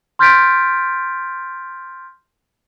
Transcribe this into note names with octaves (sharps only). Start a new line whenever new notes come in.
C6 F6 G6 A6 B6 D7